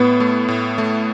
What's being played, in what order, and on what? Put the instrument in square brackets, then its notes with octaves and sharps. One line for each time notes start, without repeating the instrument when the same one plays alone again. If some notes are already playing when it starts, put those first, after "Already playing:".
Already playing: [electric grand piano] A2 [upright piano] B3
[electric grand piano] A3
A2
A3